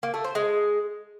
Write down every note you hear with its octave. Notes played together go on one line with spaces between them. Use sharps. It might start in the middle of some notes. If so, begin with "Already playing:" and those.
A#3
A3
C5
G#3